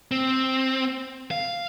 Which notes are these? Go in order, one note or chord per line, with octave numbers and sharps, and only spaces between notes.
C4
F5